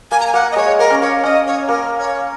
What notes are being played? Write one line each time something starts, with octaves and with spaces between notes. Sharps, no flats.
A#3 G#5
A#5
G#5
A#3 F#5
D#5
G#3 C#5
A#3 A#4
C#4
A#3 C#5
C#4 D#5
C#5
A#3 A#4
C#5